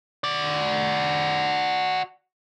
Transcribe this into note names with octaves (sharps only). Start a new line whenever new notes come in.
F#4 D5